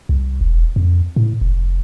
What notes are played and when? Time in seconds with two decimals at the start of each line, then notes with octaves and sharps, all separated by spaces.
0.09 C2
0.41 E1
0.76 F2
1.16 A2
1.41 F1